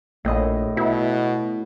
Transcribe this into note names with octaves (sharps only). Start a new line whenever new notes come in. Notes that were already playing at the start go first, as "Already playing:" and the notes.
A#1 A2 D#5
B2 E4